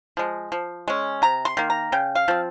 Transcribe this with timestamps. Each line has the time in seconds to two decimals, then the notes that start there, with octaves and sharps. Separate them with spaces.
0.17 F3 G#3
0.52 F3
0.88 G#3 C#4
1.22 C3 A#5
1.45 C6
1.57 D#3 A#3
1.70 A#5
1.92 C#3 G5
2.15 F5
2.28 F3 C4